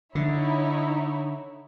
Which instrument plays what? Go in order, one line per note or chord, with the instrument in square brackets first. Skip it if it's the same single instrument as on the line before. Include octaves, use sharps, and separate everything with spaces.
[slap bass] D3 [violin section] D#4 E4 C#5